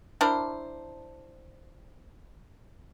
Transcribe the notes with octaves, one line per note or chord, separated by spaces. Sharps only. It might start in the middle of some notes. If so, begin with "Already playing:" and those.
D4 E4 A#4 C5